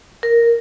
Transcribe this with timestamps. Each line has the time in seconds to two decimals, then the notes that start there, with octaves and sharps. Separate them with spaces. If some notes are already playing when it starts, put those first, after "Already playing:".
0.23 A#4